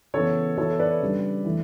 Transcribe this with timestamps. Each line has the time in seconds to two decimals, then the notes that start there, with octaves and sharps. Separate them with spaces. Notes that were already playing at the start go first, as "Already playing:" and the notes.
0.14 C#3 E3 B3 A4 C#5
0.58 E3 B3 E4 A4 C#5
0.79 B4 D5
1.01 C#3 G3 D4
1.45 E3 A3